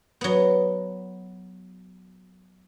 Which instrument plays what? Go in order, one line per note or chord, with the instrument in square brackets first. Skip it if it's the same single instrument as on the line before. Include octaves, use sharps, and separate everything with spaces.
[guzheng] F#3 B3